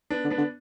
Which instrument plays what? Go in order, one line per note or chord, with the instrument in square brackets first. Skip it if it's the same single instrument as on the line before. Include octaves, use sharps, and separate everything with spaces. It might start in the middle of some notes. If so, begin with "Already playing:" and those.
[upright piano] B3 D4
[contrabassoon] D3
[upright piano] B3 D4
[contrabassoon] D3